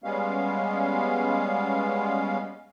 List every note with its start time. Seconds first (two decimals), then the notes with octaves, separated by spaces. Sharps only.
0.04 G3 G#3 B3 C#4 F5